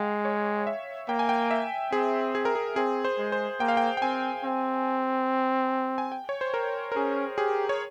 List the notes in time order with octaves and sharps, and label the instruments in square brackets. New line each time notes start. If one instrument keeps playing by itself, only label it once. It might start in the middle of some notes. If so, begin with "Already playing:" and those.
Already playing: [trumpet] G#3 [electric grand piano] F5 G5
[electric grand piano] C#5
E5
[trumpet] A#3 [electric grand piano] G5
[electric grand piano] G#5
G5
E5
[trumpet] C4 [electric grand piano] G#4
[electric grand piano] G#4
A#4
G#4
[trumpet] C4 [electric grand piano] G#4
[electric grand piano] C5
[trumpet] G#3
[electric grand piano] C5
[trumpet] A#3 [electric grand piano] G5
[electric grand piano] F5
G5
G5
[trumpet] C4 [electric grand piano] G#5
[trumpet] C4
[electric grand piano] G#5
G5
C#5
C5
A#4
A#4
[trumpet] C#4 [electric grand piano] G#4
[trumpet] G4 [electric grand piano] G#4
[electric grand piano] C#5